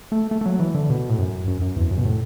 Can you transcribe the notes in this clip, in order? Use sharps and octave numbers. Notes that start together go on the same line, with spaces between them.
A3
A3
A3
F#3
E3
D3
B2
A2
F#2
F#2
F#2
E2
F#2
B2
A2